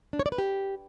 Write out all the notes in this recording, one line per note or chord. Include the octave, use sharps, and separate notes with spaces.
D4
C#5
D5
B4
G4